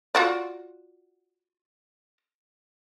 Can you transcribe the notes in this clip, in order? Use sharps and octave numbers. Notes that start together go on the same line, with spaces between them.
F4 F#4 D5